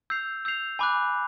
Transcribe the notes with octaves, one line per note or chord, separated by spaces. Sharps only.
E6 G6 C7 F7
E6 G6 C7 F7
G#5 B5 D6 F#6